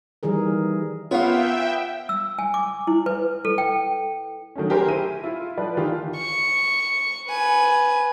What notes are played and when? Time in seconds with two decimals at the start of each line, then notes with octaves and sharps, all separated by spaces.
0.23 D#3 E3 G3 G#4 A#4
1.11 B3 F4 A#4 C#5 E5 F5 G5
2.09 E6
2.39 G#5
2.54 D6
2.87 E4
3.06 B4
3.45 A4
3.58 G5
4.56 D#3 F#3 A3 C#4
4.70 G4 G#4 A#4 C5
4.86 E4 D#7
5.24 E4 F4
5.58 F3 B4 D5
5.77 D#3 E3 F4 G4
6.18 C#6
7.29 B4 G#5